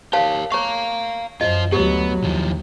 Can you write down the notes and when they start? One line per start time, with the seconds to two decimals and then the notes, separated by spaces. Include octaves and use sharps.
0.13 G4 A#4 C#5 F5 A5
0.52 C#5 F5 A#5 C#6
1.41 F#2 F4 C5 D#5
1.72 D2 F#3 B3 G4
2.24 D#2 D#3 F3